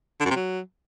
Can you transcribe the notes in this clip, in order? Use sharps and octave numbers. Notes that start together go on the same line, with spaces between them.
D3
F#2
C3
F#3